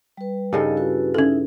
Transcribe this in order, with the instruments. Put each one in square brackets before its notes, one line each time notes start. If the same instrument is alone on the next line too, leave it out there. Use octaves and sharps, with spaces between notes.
[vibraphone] G3 B4
[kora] G2 C#3 A4 [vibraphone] D#4 D#5
[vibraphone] E4 F#4 B4
[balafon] C#4 A4 [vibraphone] D#4 E4 E5